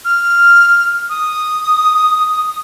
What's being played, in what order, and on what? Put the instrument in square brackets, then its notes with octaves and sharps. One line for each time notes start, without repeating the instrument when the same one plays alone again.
[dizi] F6
D#6